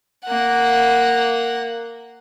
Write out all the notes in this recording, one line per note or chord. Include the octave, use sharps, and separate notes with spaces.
A#3 F#5